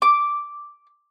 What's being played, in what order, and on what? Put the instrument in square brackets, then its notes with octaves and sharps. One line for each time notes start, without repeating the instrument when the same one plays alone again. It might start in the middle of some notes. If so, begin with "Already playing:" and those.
[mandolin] D6